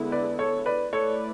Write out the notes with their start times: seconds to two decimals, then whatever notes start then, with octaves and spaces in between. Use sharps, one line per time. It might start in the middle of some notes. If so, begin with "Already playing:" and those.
Already playing: D3 G#3 B3 E4
0.12 B4 D5
0.39 A4 C#5
0.66 B4 D5
0.93 A3 E4 A4 B4 C#5 D5